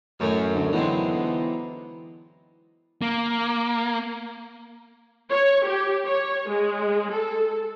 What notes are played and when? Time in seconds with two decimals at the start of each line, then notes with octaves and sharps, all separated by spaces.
0.20 F#2 A2 D#3 C#4
0.55 D2
0.73 D3 E3 F#3 G#3 B3 C4 D#4
3.02 A#3
5.30 C#5
5.67 G4
6.06 C#5
6.49 G#3
7.12 A4